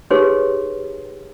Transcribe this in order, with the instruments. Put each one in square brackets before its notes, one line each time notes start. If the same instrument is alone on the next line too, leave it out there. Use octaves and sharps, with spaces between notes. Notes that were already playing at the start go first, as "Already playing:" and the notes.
[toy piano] D#4 G4 G#4 B4 C#5 C6